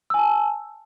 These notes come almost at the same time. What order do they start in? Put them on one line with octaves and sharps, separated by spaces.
E6 G#5 A5